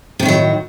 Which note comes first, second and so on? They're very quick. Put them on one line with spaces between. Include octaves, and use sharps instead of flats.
C3 A2 D#3 F#3